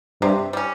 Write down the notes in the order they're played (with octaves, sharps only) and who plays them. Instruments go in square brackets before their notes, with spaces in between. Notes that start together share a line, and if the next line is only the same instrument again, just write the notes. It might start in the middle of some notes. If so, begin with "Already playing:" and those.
[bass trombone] G2 [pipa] C3
[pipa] G3 C#4